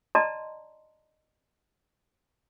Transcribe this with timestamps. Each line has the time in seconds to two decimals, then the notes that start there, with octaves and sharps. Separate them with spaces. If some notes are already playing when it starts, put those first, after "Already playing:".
0.15 D5 D#5 A5 A#5 C6